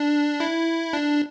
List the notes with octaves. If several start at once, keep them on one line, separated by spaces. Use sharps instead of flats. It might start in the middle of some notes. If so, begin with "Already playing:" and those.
Already playing: D4
E4
D4